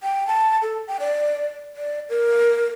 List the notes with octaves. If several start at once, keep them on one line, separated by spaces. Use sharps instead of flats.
G5
A5
A4
G5
D5
D5
A#4